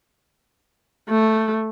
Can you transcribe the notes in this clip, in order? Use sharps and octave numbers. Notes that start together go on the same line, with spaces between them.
A3